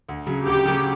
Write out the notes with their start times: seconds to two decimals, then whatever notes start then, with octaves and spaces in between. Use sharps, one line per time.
0.09 D2
0.26 C#3 F#3
0.46 D2 G4
0.65 C#3 F#3